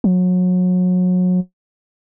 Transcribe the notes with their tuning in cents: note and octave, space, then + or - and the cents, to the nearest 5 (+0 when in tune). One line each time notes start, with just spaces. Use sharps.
F#3 -30